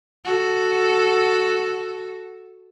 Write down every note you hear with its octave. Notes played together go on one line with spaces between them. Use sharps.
F#4 A4